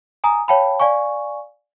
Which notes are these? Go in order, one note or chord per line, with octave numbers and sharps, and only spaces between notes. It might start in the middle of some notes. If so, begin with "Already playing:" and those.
G#5 A#5 D#6
C#5 F5 G5 A5 B5
D5 F5 G#5 C#6